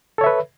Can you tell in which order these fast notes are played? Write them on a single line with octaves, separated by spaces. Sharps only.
A4 C#5 E5 B4